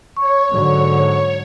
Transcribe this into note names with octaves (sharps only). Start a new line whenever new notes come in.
C#5 C#6
G#2 D3 F#3